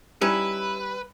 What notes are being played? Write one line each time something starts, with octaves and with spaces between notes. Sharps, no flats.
G3 C#4 D#4 E4 B4